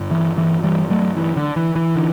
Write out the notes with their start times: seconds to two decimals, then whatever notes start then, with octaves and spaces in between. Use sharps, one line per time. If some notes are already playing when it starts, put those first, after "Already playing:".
Already playing: G2 D3
0.11 E3
0.38 E3
0.64 E3 G3
0.90 F#3 A3
1.17 E3
1.36 D3
1.56 E3
1.76 E3
1.96 D3